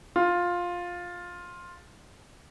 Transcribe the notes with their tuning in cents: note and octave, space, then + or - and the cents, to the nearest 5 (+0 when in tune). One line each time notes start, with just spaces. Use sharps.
F4 +10